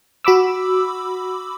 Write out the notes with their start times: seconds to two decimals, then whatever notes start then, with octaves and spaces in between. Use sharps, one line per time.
0.25 F#4 B5 D6 E6